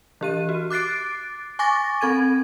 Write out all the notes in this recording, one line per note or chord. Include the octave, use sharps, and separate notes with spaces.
E3 G4 D#7
F#4
D6 F#6 A6 C7 D7
G#5 C#6 D6 A6 A#6
C4 A4 G#6 D#7